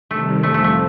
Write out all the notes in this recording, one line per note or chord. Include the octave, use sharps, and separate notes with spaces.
C3 D#3 G3 A3
F2 C3 F3 A3
A3
A3